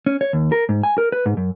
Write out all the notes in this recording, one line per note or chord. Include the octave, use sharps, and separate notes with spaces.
C#4
C#5
D#2
A#4
G#2
G#5
A#4
B4
G#2
F#2